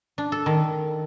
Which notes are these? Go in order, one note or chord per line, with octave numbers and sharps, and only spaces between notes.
D4
A4
D#3